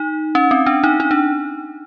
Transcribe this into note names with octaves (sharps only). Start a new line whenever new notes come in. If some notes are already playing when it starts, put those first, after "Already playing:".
Already playing: D#4
C#4
C4
D4
D#4
D#4
D4